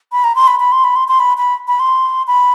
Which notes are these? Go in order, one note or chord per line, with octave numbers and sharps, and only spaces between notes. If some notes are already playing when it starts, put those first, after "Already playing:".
B5
A#5
C6
B5
B5
C6
B5
C6
C6
B5
B5
B5
C6
B5